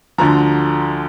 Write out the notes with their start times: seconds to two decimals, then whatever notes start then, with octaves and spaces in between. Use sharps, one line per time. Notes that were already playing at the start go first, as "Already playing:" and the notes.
0.18 D2 D3 F3 A#5